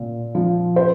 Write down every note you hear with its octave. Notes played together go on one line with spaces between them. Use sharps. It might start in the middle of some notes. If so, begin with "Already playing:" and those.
Already playing: A#2
F3
C5